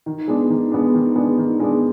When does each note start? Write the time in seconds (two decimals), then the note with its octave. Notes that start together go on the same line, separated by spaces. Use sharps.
0.06 D#3
0.28 G#3 B3 D4
0.50 D#3
0.72 G#3 B3 D4
0.95 D#3
1.15 G#3 B3 D4
1.38 D#3
1.60 G#3 B3 D4